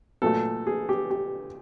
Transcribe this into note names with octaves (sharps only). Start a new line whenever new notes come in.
A#2 F#3 A3 A4
G#4
G4
G4